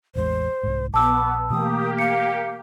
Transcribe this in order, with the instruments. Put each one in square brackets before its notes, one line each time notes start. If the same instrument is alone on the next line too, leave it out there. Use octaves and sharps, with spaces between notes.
[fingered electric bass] A1 E2 G#3 [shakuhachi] C5
[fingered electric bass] C2 G#2
[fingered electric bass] A#1 [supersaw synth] B3 [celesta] A5 E6 [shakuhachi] D6
[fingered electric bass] B2 E3 A3 [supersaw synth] A#3 G4 [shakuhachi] D#6
[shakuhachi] F5 [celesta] C#7